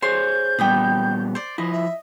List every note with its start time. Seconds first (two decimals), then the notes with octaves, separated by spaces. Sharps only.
0.02 G#4 C5 C#5 C6 G6
0.59 A#2 G3 B3 G5 B5 D#6
1.35 C5 D5
1.58 F3 E4 D#5
1.72 E5